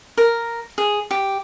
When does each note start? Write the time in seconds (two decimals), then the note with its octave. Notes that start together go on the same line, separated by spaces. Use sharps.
0.18 A#4
0.78 G#4
1.11 G4